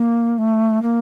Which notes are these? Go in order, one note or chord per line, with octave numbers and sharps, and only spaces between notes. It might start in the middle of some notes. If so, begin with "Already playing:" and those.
Already playing: A#3
A3
A#3